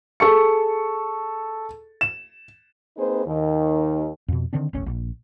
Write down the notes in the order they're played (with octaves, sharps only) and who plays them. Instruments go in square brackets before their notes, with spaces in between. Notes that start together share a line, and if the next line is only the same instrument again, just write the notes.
[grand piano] G#4 A4 C#6 C#7
E7
[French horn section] A#3 C4 D#4 G#4 B4 C5
D#2 D#3
[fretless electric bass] F2 B2
D3 D#3 C4 D4
E1 A1 A2 C#4
A#1